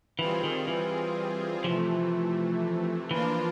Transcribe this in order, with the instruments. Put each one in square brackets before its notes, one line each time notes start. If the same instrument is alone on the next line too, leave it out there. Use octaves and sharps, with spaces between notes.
[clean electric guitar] E3 [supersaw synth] G3 C4 F4 G#4
[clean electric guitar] D#3
E3
[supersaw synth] C3 E3 A3 [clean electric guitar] F3
[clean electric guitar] E3 [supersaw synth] F3 A#3 D4 F4